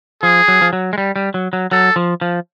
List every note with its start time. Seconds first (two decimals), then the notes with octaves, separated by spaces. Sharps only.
0.23 F3 G#4
0.48 F#3
0.62 F3
0.73 F#3
0.93 G#3
0.98 G3
1.16 G3
1.34 F#3
1.53 F#3
1.72 F#3 A4
1.96 F3
2.21 F3